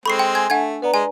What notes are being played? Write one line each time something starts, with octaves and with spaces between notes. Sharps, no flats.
G#3 C4 A4 B5 C#6 C7
G5
G#5 G#6
A3 D4 F#5 G#5 G#6
B3 B4 D5 A#5
G#3 G#5